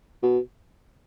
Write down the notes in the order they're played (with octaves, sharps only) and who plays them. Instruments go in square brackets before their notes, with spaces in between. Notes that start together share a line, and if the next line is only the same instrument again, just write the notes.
[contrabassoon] B2